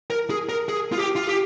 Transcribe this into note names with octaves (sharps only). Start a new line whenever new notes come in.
A#4
G#4
A#4
G#4
F4
G4
F4
G4